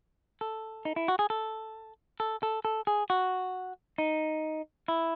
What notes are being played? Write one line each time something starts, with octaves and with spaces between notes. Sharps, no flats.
A4
D#4
E4
F#4
G#4
A4
A4
A4
A4
G#4
F#4
D#4
E4